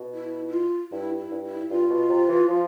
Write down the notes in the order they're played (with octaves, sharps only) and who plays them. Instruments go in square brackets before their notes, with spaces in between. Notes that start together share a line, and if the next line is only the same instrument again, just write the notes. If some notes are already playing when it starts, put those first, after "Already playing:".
Already playing: [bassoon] B2
[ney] E4
E4
F4
[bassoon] G2 [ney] E4
[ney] E4
[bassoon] G2
[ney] E4
[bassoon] G2 [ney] F4
[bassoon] B2
C3
E3
F3